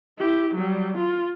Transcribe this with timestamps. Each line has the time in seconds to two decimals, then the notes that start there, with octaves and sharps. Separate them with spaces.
0.18 E4 G4
0.55 F#3 G3
0.97 F4